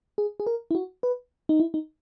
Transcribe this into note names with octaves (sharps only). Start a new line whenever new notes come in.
G#4
G#4
A#4
E4
F#4
B4
D#4
E4
D#4